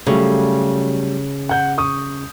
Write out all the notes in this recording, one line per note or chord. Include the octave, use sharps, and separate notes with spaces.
C#3 F#3 G3 A3
F#5 G6
C#6 D#6